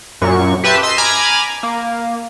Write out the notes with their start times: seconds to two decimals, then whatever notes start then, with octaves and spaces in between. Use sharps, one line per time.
0.22 F#2 A#2 C#6
0.64 G4 B4 E5 A5 C6
0.83 D#5 C6 E6 B6 C7
0.98 G#5 A#5 B5 D6 F6 G#6
1.63 A#3